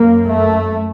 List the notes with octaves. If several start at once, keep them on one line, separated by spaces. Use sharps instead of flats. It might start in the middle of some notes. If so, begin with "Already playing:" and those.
Already playing: F#2 A#3
A3